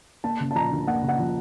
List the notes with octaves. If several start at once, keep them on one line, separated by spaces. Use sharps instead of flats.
A#3 A5
C#3
A5
F3 A#5
D2
A#3 F#5
C#3
F#5
F3